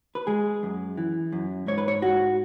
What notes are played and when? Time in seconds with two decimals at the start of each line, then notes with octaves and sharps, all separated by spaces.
0.15 B4
0.27 G#3 G#4
0.63 F#2
0.98 E3
1.32 F#2
1.67 G#2 C#5
1.78 B4
1.88 C#5
2.02 G#2 F#4